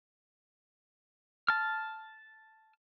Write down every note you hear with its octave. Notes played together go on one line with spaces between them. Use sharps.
A5 F6